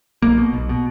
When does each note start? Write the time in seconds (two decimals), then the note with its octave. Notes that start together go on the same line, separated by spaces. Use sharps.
0.22 B1 A#3
0.37 B2
0.54 B1
0.69 B2